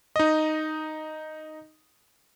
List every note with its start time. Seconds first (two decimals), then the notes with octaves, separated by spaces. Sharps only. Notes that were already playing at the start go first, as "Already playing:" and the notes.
0.16 D#4 D#5